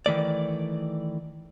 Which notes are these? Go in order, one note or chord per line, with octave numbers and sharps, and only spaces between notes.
D#3 E3 A3 D5